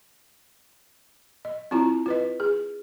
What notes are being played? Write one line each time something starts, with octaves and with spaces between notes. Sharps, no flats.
D#5
C4 E4 F4 A#5
F4 B4 D#5
G#4